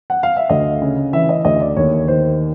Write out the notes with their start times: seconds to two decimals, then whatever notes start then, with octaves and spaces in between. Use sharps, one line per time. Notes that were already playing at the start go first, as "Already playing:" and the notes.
0.10 F#5
0.23 F5
0.36 E5
0.49 D2 D#5
0.82 C#3
1.13 E3 E5
1.29 D#5
1.45 D2 D#5
1.61 D5
1.76 D#2 C#5
2.08 D#3 C5